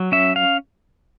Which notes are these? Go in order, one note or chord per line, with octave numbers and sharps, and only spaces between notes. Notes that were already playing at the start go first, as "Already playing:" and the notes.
Already playing: F#3
C#4 E5
F5